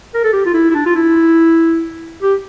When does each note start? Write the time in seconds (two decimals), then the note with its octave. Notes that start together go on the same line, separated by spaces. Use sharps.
0.14 A#4
0.24 A4
0.33 G4
0.46 F4
0.54 E4
0.71 E4
0.75 D4
0.86 F4
0.96 E4
2.23 G4